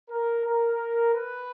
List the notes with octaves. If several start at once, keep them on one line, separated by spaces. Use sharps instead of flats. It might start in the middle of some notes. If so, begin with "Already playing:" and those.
A#4
A#4
B4